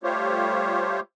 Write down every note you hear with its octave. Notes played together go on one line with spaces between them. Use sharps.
G3 A3 F4 G4 C5 C#5